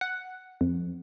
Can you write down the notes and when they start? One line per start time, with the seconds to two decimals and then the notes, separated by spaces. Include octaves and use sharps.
0.01 F#5
0.61 F2